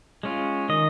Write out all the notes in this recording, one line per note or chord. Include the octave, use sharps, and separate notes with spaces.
G#3 C#4 F4
D#3 D#5